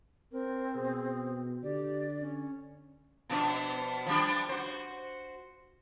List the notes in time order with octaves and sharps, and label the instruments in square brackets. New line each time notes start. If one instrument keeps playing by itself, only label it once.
[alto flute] C4 [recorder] A#4
[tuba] B2 [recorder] G#4
[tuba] D3 [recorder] G4 [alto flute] D5
[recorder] C#4
[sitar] B2 F3 D4
F3 G3 D4
F#4 C5